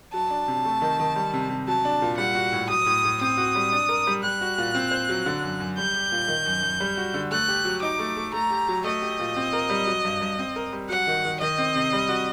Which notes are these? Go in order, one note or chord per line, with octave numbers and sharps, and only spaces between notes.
F#3 A5
D4
C3
A3
D#3
D#3
G3
C3
C3
F#3 A5
D4
A#2
G3 F#5
F#4
A2
F#3 D#6
A2
A2
C4 D#6
F#4
G3
D4
A#4
G3
G3 F#6
F#4
A#2
C4
C5
F#3
D3
F#2
F#2
G3 G6
G4
A#2
D#3
F#2
F#2
G3
F#4
D3
A3 F#6
G4
F#3
D#4 D6
A3
A3
A3 A#5
G4
F#3
A3 D#5
G4
A#2
C4
A#4
G3
F#3
G2
G2
C4
A#4
G3
F#3 F#5
D#3
D#3
D#3 D#5
C4
C3
G3
F#4